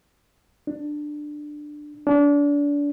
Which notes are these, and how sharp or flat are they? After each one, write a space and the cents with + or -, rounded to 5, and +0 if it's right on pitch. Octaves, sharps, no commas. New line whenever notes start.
D4 +15
D4 -30